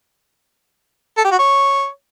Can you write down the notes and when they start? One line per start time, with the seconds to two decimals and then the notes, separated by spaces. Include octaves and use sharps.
1.17 A4
1.25 G4
1.32 F#4
1.39 C#5